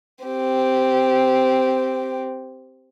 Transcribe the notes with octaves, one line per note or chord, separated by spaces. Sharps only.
C4 G4